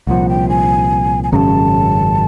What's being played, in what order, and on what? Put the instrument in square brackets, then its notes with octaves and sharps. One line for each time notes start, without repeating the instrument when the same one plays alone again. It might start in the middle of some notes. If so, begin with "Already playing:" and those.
[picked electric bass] C2 A#2 F3 [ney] F#5
[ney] G5
G#5
G#5
[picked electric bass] G#1 F#2 C#3 [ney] A5 A#5